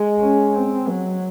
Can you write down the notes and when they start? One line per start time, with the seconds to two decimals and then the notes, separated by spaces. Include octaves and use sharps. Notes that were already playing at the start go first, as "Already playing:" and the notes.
Already playing: G#3
0.20 C#4
0.55 C4
0.88 F#3